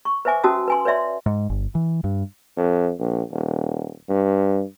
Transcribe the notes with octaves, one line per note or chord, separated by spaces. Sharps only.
C#6
B4 C5 E5 G#5 D6
C#4 F#4 A5 D#6 E6
B4 G#5 C6
B4 C#5 D5 E5 C6
G#2
G1
E3
G2
F2
A#1
D#1
G2